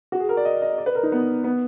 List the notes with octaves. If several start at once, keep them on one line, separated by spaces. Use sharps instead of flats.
F#4
G#4
A#4
D5
D#5
D#5
D5
B4
A#4
D#4
B3
B3